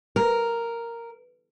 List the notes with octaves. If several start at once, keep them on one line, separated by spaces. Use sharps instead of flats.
A#4